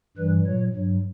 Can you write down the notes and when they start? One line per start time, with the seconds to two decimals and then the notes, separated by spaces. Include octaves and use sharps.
0.17 G2 E3 G3 B4
0.45 A#2 F#3 C#5
0.74 G2 F#3